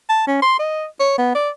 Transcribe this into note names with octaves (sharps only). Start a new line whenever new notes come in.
A5
C#4
C6
D#5
C#5
B3
D5